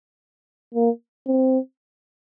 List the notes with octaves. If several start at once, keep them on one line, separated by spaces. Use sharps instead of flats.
A#3
C4